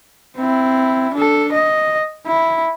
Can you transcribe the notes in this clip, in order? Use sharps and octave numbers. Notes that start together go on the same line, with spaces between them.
C4 E4
D4 A4
D#5
E4